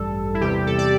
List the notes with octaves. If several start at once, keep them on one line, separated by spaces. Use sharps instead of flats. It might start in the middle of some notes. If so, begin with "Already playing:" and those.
Already playing: A1 G2 G3 A4
E4
E2 C3 G3 G4
A4
D5